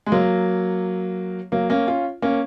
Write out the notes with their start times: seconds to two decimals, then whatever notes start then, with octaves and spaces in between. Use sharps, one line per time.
0.06 G#3
0.12 F#3 A#3
1.52 F#3 A#3
1.70 A#3 C#4
1.87 C#4 F4
2.22 A#3 C#4